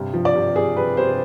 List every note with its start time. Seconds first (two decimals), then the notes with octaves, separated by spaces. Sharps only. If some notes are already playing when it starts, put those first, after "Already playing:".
Already playing: G2 C3
0.14 F3
0.25 D5
0.35 C3
0.56 C3 G#4
0.76 C3 B4
0.97 C3 C5